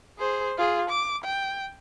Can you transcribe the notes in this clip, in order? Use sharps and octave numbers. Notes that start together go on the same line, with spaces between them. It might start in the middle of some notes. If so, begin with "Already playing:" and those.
G#4 C5
F4 G#4
D6
G5